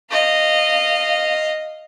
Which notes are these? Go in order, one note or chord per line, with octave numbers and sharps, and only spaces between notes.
D#5 F5